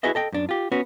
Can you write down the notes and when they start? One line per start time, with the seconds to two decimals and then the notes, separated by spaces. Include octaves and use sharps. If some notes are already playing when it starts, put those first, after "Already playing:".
0.03 E4 F#4 G#4 B4 D#5 E5
0.15 A4 D#5 G5
0.32 F#2 D4
0.49 F4 G4
0.72 B3 C#4 F#4